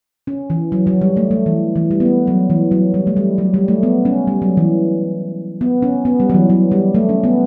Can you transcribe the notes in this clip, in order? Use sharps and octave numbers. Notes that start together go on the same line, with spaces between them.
C#4
E3
F#3
F#3
G3
A3
A3
E3
E3
G3
B3
A3
F#3
E3
F#3
G3
A3
G3
F#3
G3
A3
B3
C#4
G3
F#3
E3
B3
C#4
B3
G3
F#3
E3
F#3
G3
A3
C#4
B3